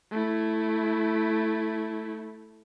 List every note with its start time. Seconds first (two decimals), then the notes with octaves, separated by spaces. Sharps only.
0.11 A3 E4